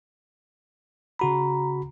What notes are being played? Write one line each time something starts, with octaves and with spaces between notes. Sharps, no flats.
C#3 F#4 A#5 B5